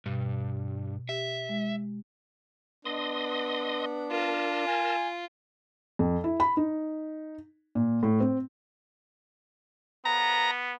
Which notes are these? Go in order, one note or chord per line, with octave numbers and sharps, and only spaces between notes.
G2 B2
G4 E5
G#3
B3 D4 D#5 C6 D#6
F4 A#4 A5
G#5
F2
E4
B5
D#4
A#2
A2
C4
B3 A#5